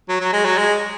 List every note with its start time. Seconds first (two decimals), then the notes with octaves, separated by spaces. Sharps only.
0.09 F#3
0.20 F#3
0.33 G#3
0.45 F#3
0.57 G#3